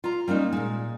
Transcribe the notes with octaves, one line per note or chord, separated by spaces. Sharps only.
F4 A#5
G3 A#3 C#4 D#4
A#2 G#3